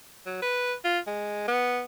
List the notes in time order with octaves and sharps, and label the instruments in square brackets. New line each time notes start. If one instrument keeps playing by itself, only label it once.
[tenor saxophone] F#3
B4
F4
G#3
B3